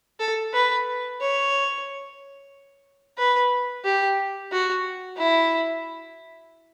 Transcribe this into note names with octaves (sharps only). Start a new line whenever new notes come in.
A4
B4
C#5
B4
G4
F#4
E4